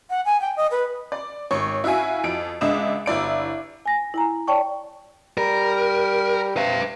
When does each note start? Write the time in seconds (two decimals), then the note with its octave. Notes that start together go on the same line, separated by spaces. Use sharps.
0.10 F#5
0.25 G#5
0.41 G5
0.56 D#5
0.71 B4
1.12 D5
1.51 G#1 C#5 C#6
1.84 E4 F#4 E5 F5 G#5
2.24 F2 D7
2.61 C#2 G#3 D4 E5 D#6 E7
3.06 G1 E4 D5 D7
3.86 G#5 A#6
4.14 E4 G#5 A#5
4.48 C#5 D5 G5 A5 C#6
5.38 G3 A#4
6.57 C3 B4 F5